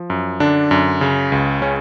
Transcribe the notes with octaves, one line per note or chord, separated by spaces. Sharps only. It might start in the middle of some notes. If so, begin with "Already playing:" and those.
Already playing: F3
F#2
D3 D4
F#2
C#3
C#2
C#3 C#4